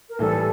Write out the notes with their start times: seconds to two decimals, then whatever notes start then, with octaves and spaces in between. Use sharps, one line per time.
0.09 A#4
0.19 A2 E3 G3 A4